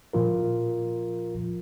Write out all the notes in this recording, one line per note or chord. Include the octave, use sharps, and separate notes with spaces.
A#2 F3 F4 A#4